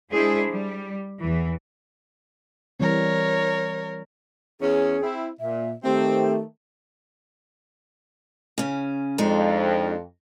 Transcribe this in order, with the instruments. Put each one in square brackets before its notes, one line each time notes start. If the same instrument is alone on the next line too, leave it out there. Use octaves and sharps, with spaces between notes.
[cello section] G#3 D4 E4 G#4 C5
G3
E2 E3
[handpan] E3 G3 C4 [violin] A#4 C#5
[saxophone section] E2 C#4 [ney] G#4
[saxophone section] C4 E4
[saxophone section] A#2 [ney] E5
[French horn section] D#3 A3 [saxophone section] C4 [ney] G4
[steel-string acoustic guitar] C#3 C#4
[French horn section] F2 [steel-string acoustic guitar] G#3 D4 D#4